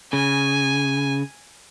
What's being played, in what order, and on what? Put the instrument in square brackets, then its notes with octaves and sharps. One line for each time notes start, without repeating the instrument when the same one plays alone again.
[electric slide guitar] C#3 [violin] G#5